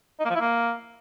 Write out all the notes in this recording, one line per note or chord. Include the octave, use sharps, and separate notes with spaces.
D#4
A#3
F3
E4
A#3